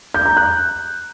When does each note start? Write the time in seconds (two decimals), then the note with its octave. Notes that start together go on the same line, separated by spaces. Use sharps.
0.14 G6
0.26 A#5
0.37 F#6